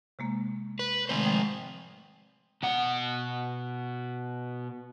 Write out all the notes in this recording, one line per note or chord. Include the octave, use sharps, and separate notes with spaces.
C3 G#3 A#3
B4
C3 D#3 G#3 A3 C4 C5
F3 G5 D#6
B2 F#5